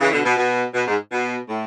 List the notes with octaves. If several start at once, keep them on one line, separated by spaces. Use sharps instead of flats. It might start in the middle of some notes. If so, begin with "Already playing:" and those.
C#3 E3
B2 D3
B2
B2
B2
G#2
B2
A2